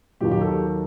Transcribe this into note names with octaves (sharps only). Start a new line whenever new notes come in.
D#2 D#3 F#3 G4
G4
A4